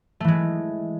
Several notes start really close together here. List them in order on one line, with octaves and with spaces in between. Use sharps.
A3 E3 G#3